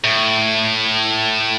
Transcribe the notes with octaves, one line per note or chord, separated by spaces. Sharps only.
A2